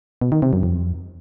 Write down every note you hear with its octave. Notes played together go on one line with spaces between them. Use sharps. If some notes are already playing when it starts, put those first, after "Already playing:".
B2
D#3
C3
F#2
F2